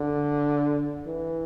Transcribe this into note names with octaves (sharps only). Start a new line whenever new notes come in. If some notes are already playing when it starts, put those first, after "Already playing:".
Already playing: D3
E3